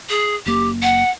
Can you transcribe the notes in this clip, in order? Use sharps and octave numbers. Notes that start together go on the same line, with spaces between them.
G#4
F#1 A#3 G4
F#5